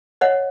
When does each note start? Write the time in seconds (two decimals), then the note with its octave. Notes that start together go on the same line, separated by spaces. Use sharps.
0.21 C#5 D#5 F#5